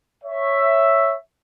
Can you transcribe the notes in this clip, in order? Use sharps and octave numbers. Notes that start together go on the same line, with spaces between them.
C#5 E5